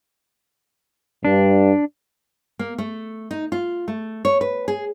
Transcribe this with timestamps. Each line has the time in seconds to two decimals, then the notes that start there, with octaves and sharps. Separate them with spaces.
1.25 G2 D4
2.59 A#3
2.78 A3
3.31 D#4
3.52 F4
3.88 A3
4.25 C#5
4.41 B4
4.68 G#4